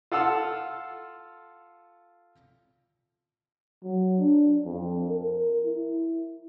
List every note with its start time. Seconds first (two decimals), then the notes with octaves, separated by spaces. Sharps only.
0.12 F4 A4 F#5 C6 E6 F6
3.84 F#3
4.19 D4
4.65 F2
5.09 A#4
5.65 E4